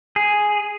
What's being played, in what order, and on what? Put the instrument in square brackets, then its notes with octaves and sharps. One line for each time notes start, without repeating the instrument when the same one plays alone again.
[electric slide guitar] G#4